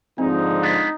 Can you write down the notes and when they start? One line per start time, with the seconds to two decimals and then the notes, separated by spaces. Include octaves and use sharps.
0.18 G#2 D3 F3 C4 D#4
0.62 G#3 B3 D4